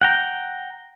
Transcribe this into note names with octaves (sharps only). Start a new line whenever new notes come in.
F#5 G5 A#5